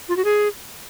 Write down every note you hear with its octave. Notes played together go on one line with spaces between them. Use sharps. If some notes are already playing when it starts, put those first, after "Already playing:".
F4
F#4
G#4